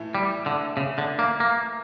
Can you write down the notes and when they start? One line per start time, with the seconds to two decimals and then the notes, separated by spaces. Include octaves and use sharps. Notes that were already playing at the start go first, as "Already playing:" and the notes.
Already playing: A2 E3 A3 E4
0.15 G3
0.46 D3
0.77 C#3
0.98 D3
1.19 A#3
1.40 A#3